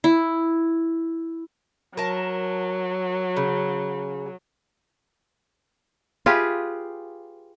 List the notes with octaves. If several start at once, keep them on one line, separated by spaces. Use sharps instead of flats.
E4
F#3 A#4 A5
C#3
F4 G4 G#4 B4